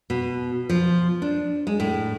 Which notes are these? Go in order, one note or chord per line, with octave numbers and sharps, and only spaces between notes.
B2
F3
D4
G#3
A2